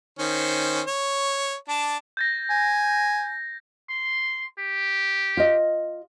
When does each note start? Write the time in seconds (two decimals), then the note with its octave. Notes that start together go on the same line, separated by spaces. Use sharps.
0.19 D#3 C#4 C5
0.87 C#5
1.68 D4 A5
2.17 G6 A6 A#6
2.50 G#5
3.90 C6
4.59 G4
5.37 F4 D#5